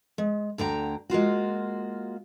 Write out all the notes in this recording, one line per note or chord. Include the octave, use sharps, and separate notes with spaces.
G#3
D2 D3 G5 A#5
G#3 A#3 F4 F#4